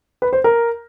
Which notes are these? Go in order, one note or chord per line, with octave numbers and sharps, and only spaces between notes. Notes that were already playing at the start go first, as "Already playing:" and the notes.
B4
C5
A#4